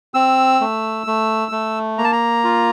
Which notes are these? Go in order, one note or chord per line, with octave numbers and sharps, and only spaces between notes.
C4 E6
A3
A3
A3
A#3 A#5
A5
A#5
F4